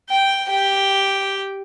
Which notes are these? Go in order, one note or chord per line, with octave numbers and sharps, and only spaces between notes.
G5
G4 G5